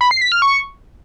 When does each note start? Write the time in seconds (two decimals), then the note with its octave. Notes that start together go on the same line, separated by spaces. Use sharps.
0.01 B5
0.11 C7
0.21 B6
0.32 F6
0.42 C#6